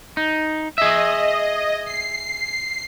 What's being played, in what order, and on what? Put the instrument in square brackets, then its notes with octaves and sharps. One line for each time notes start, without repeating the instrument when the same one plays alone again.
[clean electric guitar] D#4
[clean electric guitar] G#4 E5 [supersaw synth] D#5
[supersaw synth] C7